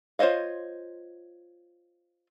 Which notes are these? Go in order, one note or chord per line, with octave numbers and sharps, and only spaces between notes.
F4 C5 C#5 D#5 F5